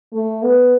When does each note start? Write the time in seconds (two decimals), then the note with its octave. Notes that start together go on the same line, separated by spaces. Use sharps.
0.13 A3
0.43 B3